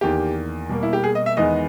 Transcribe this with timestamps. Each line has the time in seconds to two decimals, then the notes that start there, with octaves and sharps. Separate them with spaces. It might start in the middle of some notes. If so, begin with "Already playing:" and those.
0.01 E2 D#3 A#3 G4
0.69 B2 G3 A#3
0.83 E4
0.93 G4
1.04 G#4
1.15 D#5
1.26 E5
1.37 E2 D#3 G#3 B3 D#5